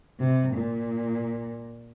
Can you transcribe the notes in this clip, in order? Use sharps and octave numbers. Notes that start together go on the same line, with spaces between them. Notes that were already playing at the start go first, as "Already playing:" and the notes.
C3
A#2